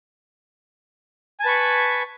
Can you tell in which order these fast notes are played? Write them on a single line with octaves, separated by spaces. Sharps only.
G#5 A5 B4 C#6 B5